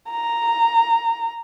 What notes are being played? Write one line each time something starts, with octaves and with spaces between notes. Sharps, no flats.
A#5